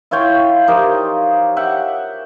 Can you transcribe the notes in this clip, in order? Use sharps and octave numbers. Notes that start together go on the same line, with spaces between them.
E4 F4 C#5 G5
F3 D#4 G4 A#4
E5 F#5 G5